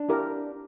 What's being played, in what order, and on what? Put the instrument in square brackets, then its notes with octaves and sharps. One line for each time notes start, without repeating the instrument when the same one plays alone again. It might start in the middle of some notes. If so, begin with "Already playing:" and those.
Already playing: [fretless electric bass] D4
[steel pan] E4 G4 A#4 D5